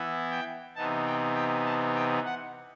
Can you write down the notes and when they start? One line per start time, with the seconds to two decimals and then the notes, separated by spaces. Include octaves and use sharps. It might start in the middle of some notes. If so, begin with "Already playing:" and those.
Already playing: E3 B3 E4
0.31 G5
0.76 C3 E3 B3 D#4 A5
1.06 G5
1.35 G5
1.66 A5
1.95 G5
2.25 F#5